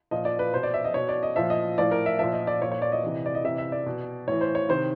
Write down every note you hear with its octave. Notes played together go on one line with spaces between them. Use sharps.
A#2 F3 D#5
D5
B4
B2 C5
D5
E5
D#5
B2 C#5
D5
D#5
A#2 F3 E5
D#5
A2 F3 D5
A#4
E5
A#2 F3 E5
D#5
D5
A#2 F3 C#5
C#5
D5
D#5
C3 E3
D5
D#5
C3 E3 E5
E5
D5
B2
A2 E3 C#5
C5
C#5
C3 D#3 C5